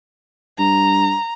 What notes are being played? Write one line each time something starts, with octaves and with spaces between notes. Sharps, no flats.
G2 A#5